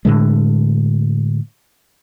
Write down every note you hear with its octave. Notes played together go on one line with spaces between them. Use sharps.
A2 D3 G#3